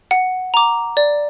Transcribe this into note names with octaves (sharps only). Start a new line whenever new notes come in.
F#5
A#5 D6
D5